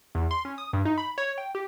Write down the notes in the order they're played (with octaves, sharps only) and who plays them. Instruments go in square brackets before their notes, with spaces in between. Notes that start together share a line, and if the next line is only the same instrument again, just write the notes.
[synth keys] E2
C6
C#4
D#6
G2
D#4
B5
C#5
G5
G4